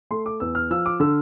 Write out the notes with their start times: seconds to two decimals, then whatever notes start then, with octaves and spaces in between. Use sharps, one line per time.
0.11 A3 C6
0.26 D6
0.40 E2 E6
0.55 F6
0.71 F3 E6
0.86 D6
1.00 D3 E6